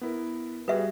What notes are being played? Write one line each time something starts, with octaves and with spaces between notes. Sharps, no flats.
B3 E4 A#4
G3 F#4 G#4 B4 E5